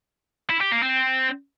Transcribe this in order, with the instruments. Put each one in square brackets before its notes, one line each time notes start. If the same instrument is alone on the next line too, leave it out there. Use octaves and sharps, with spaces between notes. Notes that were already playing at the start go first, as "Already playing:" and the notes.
[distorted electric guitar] E4
G4
A#3
C4